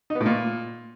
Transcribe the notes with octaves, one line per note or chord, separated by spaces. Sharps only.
D#4
B3
A2
A#2